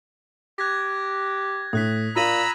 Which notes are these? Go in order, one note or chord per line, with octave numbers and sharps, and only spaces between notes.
G4 F#6 G#6 A#6
A2 D#6 F#6 B6
A#2 F4 A#5 B5 E6 B6 D#7 F#7